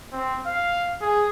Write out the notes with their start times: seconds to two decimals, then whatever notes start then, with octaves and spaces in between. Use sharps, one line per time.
0.12 C4
0.46 F5
1.01 G#4